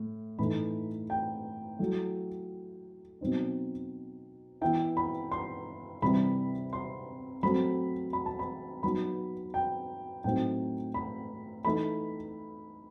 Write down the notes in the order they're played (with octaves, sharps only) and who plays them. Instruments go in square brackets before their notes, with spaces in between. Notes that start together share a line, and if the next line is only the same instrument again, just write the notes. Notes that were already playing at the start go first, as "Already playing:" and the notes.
Already playing: [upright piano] A2
A2 E3 A3 D#4 B5
G5
F#3 A3 E4
B2 F#3 C4 D#4
E3 B3 E4 G5
B5
C6
C3 E3 G3 B5
C6
F#3 A3 C4 B5
B5
A5
B5
F#3 B3 D#4 B5
G5
A2 F#3 C4 D#4 G5
B5
E3 A3 D#4 B5